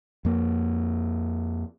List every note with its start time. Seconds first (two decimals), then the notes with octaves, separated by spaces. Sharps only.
0.25 F2 A#3